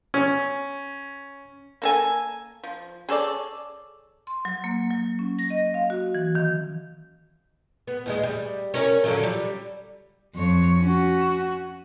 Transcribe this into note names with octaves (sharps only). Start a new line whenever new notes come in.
C#4
A#3 A4 G#5
F3
G#4 A4 C#5 D5
C6
F#3
A#3
F#3
C#4
A#6
D#5
F5
F#4
E3
D#3
B3
D#2 G3 G#3
G3
C#4 A#4 C#5
D3 F3 F#3
G3
F2 C#5
C#4 F#4